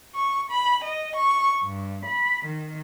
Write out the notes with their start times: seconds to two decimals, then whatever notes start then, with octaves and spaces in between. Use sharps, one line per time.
0.16 C#6
0.51 B5
0.84 D#5
1.16 C#6
1.63 G2
2.07 B5
2.45 D#3